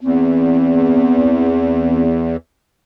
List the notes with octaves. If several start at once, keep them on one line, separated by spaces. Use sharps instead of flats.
E2 C4